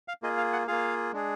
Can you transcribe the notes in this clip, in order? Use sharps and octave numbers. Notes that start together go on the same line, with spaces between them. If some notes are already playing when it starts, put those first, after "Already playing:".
F5
A#3 F4 G#4 D#5
F5
F#5
A#3 F4 G#4 F5
G#3 D4 G#4